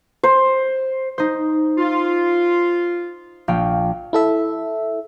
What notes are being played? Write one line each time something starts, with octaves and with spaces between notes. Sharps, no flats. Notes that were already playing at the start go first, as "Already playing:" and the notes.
C5
D#4 C5
F4
A#1 F5 G5
E4 A4 E5